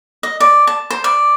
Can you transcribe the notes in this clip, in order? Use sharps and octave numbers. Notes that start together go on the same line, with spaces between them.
D#5
D5
A5
C5
D5